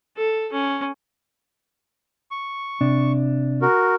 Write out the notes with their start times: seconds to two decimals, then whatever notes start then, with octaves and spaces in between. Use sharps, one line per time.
0.17 A4
0.52 C#4
2.31 C#6
2.81 C3 D4
3.62 F#4 A#4